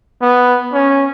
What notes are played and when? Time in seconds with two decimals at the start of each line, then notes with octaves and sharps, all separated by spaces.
0.21 B3
0.73 C#4